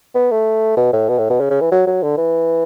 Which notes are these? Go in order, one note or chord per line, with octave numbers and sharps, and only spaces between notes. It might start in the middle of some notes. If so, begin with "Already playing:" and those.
B3
A3
B2
A2
B2
A2
B2
C#3
C#3
E3
F#3
F#3
D3
E3